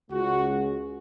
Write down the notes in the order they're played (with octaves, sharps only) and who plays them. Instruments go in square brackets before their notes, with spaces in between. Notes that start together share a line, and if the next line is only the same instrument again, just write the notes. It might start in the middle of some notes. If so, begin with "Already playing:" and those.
[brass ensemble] C#2 C#3 G#3 F#4